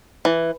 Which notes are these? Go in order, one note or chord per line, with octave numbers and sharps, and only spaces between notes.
E3